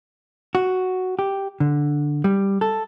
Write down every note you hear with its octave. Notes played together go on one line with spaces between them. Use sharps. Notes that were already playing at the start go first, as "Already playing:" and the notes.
F#4
G4
D3
G3
A4